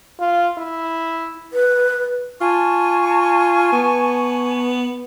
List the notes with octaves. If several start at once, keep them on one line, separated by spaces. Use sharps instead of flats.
F4
E4
B4
F4 G#5 A5 C#6
B3